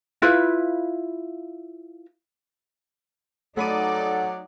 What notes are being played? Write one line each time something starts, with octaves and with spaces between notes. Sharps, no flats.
E4 F4 B4
F#3 A3 D#4 A4 D5 F#5 B5 D#7